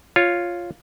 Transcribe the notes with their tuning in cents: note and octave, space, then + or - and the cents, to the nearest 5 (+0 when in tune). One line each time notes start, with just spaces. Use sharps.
F4 +0 C#5 +0